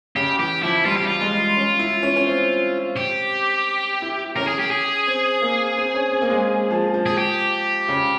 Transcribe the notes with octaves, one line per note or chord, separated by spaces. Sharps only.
C#3 G4
E3 G4
F3 E4
G3 F4
G4
F4
G#3
C#4
E4
C#4
C#4
C4
G4
E4
C#4 A#4
G#4
G4
G#4
C4
A#3
C4
C#4
C4
A#3
G#3
F3
F3
G#4
G4
C#3